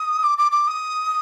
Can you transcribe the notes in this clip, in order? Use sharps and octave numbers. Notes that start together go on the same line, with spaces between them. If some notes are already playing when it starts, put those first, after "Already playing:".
Already playing: D#6
D6
D6
D6
D#6